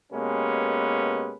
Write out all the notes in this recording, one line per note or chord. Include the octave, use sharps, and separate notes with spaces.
B2 G#3 A#3 C#4 G4 B4